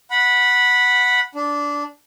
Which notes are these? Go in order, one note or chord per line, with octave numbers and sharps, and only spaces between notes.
F#5 B5
D4